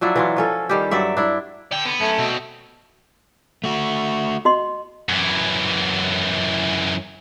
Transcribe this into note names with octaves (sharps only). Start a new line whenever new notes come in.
F3 F#3 D4 E4
E3 F#3 F4
F3 C#4 A4
D#3 G3 G4
G2 F#3 D5 E5
D4 E4 D5
D3 G5
B3
F#2 A3 C#4
G2 B2 C4
A3 F#4
F#4 D#5 C6
F#2 E3